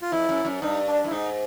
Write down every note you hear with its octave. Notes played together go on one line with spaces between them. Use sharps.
F4
F2 E4
F#2
F#2
G2 D#4
D4
G2 E4
G#2 D#4